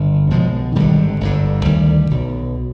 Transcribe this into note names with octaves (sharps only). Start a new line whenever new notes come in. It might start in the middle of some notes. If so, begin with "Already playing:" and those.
Already playing: G1 G2 D3
B1 B2 F3 G#3
G#1 G2 D3 D#3 G3
G1 G2 D3
D2 D3 D#3 G3
B1 B2